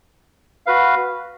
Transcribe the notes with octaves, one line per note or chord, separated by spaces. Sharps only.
F#4 B4 F5